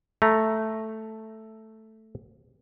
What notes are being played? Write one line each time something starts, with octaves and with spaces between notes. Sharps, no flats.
A3 A#5